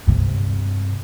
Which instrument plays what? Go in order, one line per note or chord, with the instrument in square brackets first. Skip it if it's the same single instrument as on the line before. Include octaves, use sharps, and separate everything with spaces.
[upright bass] G2 C3